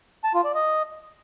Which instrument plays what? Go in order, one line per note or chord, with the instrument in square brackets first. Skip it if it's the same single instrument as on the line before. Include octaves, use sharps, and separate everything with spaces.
[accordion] A5
F4
D5
D#5